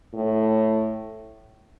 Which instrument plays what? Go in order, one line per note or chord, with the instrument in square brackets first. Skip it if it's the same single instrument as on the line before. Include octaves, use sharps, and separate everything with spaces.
[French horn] A2